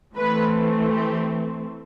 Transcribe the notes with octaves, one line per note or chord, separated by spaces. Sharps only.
E3 A3 C4 B4
G4